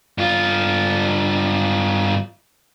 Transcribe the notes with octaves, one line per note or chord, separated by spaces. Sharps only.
G2 F4